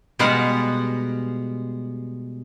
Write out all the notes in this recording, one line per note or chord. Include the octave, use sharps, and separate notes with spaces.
B2 G3 G#3 B3 F5 F#5